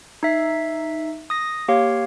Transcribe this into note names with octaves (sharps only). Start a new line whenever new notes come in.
D#4 E5 C7
D#6 A#6
A#3 G4 C#5 F5